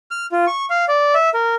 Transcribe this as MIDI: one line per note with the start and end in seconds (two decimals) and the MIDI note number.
0.11 0.26 89
0.32 0.45 65
0.47 0.66 85
0.70 0.85 77
0.88 1.14 74
1.14 1.30 76
1.34 1.55 70